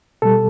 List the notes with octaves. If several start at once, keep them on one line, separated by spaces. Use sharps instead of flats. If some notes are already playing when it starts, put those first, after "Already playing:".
B2 G3 A4